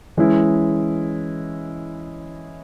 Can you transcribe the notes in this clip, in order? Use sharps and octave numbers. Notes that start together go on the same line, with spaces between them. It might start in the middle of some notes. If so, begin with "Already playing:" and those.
E3 G#3 C#4 E4